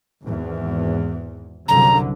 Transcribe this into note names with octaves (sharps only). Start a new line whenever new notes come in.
G#1 E2
C2 F#2 D3 A#5